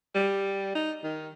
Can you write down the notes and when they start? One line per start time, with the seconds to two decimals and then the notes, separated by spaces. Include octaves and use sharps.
0.15 G3
0.75 D#4
1.03 D#3